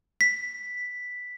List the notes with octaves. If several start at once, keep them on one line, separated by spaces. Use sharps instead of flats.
B6